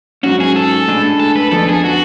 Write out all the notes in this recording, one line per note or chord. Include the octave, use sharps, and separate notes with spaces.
G#2 F#3 C#4 F#4
G#4
A4
A2 G#3 D4 G#4
A4
B4
F2 F3 B3 D4 A4
G#4
F#4